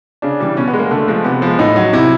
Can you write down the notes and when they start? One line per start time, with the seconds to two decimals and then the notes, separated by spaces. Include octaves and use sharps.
0.22 C#3 D4
0.40 E3 G3
0.57 B2 C#4
0.68 B3
0.73 G#3
0.79 A#3
0.91 D3 A3
1.08 F3 G#3
1.24 C3 B3
1.42 F3 G#3
1.59 A2 D#4
1.76 F#3
1.93 C3 E4